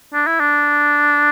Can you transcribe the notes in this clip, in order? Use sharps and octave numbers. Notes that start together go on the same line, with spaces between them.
D4
E4
D4